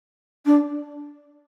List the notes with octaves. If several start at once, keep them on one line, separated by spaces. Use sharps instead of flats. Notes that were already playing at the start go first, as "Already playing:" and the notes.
D4